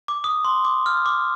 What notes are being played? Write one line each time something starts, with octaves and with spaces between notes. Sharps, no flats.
D6
D#6
C6
D6
F6
D6